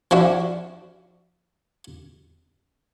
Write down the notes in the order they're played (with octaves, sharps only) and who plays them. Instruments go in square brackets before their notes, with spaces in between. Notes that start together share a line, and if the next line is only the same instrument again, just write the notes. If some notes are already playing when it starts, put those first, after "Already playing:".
[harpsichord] F3 D4 E4 F#4